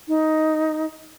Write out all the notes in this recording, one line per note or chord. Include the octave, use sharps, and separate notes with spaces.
D#4